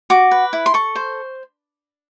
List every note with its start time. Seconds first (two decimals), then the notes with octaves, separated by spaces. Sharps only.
0.10 F#4 D6
0.31 B4
0.53 E4
0.66 C6
0.74 A4 C#6
0.95 C5